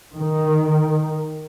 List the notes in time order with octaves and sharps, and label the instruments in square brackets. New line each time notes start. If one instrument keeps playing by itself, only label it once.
[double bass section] D#3